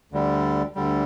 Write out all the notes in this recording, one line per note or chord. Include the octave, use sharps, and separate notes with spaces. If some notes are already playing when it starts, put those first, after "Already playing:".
D2 D3 G3
D2 D3 G3